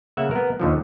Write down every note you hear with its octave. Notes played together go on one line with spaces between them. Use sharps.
C#3 A#3 E5 F#5
B3 A#4
D#2 D3 F3